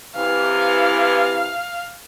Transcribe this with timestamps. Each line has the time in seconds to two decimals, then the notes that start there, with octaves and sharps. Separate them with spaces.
0.16 C3 E3 F5